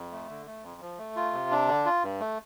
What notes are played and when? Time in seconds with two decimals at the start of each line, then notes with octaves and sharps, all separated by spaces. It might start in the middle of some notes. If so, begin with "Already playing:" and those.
Already playing: F2
0.12 A3
0.29 D3
0.46 A3
0.63 F2
0.81 F3
0.99 A3
1.16 F4
1.33 C3
1.51 D4
1.68 D3
1.85 F4
2.03 G2
2.20 A3